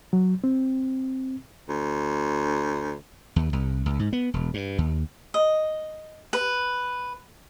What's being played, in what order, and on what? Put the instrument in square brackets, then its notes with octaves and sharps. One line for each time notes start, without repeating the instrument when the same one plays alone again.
[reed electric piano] F#3
C4
[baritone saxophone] D2
[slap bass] D#2
C2
C#2
G#2
B3
E1
G2
D#2
[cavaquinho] D#5
B4